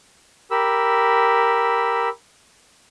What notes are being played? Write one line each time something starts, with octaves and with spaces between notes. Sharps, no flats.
G4 A#4 B5 E6